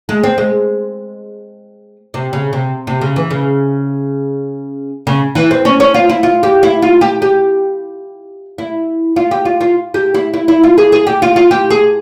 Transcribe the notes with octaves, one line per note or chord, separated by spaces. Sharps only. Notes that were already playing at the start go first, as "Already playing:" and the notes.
G#3
C4
G#3
C3
C#3
C3
C3
C#3
E3
C#3
C#3
E3
C4
C#4
C#4
F4
E4
F4
G4
E4
F4
G4
G4
E4
F4
G4
F4
F4
G4
E4
E4
E4
F4
G#4
G#4
G4
F4
F4
G4
G#4